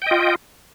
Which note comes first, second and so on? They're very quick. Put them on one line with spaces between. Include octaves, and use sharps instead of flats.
G5 D#5 F4